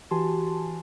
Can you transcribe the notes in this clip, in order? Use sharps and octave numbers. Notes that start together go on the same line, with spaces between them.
E3 F#4 G4 G#5 A5 C6